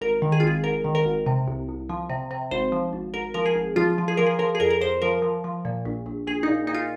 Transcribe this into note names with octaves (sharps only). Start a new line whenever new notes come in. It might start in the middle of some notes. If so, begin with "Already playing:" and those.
G#1 A#4
D#3
G#4
F4
G#1 G#4
G#1 A#4
D#3
A#4
G#1
C3
C2
C2
F3
C3
C3
G#1 C5
F3
G#1
G#1 A#4
F3 A#4
G#4
G#1
F3 F4
F3
G#4
F3 A#4
G#4
F3 A#4
G#4
F2 A#4
A#4
F2 C5
F3 A#4
F3
F3
A#2
A#1
A#1
A#1 G#4
A#2 D#4
A#2 D#4
F4